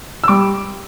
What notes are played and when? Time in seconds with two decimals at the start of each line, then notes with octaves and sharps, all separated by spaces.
0.24 E6
0.28 G3 D6